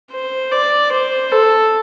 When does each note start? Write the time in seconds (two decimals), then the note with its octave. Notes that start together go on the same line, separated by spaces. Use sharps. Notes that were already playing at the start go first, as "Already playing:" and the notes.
0.11 C5
0.52 D5
0.92 C5
1.32 A4